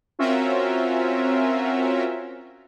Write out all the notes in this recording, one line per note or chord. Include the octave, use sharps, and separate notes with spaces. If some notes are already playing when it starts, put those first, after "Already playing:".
C4 C#4 F4 F#4 A#4 E5